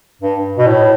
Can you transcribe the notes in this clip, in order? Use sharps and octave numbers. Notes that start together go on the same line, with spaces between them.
G2
B2
A2